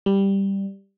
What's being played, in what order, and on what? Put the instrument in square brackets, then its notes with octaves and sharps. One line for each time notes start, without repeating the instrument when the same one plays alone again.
[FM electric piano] G3